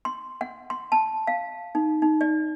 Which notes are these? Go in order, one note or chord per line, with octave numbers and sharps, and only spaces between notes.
C6
F#5
C6
A5
F5
D#4
D#4
D5